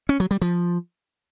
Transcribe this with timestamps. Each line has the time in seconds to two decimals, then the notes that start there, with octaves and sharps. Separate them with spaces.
0.09 C#4
0.20 F#3
0.31 G3
0.42 F3